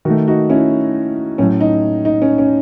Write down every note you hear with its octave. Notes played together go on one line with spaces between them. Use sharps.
D#3 A3 D#4 F#4
D#4 F#4
C#4 E4
A2 F#3 A3 C#4
D#4
D#4
C#4
C#4